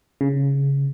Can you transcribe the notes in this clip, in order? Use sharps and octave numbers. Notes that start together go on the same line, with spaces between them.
C#3